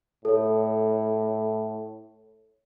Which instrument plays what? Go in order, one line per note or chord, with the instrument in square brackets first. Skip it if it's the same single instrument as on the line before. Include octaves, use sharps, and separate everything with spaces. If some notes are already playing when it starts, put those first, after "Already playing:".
[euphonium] A2 [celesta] A4 C#5